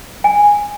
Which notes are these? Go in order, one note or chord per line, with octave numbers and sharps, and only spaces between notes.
G#5